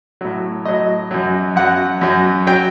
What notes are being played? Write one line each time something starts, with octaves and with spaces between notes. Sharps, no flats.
A2 F#3
A2 F#3 D#5
F#2 F#3
F#2 F#3 F#5
F#2 F#3
F#3 G5